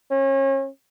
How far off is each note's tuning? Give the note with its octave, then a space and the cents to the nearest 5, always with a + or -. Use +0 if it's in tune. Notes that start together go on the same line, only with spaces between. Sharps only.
C#4 -35